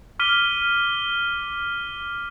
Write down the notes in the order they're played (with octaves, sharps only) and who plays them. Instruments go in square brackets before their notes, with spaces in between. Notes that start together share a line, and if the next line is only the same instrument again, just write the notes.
[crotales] D6 F6 B6 D#7 G7